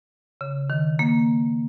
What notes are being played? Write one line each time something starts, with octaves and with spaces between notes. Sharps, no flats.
C#3
D#3
A#3